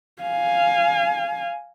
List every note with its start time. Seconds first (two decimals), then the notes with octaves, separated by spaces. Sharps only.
0.23 F5 G#5